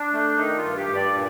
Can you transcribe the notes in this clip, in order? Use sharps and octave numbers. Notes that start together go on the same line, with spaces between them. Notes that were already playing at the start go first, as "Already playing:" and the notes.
Already playing: D4
A3
D#3 D#4
F4
G2
G4
G2
D5
A#2